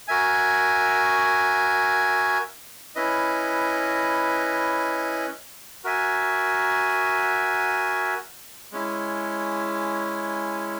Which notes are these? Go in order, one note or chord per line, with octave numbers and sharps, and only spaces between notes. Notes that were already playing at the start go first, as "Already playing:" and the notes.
F#4 A#4 E5 G#5
C#4 E4 B4 D#5
F#4 A#4 E5 G#5
G#3 C#4 E4